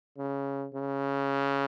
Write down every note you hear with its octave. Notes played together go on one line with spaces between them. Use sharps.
C#3
C#3